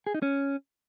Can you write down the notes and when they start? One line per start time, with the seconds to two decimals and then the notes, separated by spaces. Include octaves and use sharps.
0.07 G#4
0.14 D#4
0.22 C#4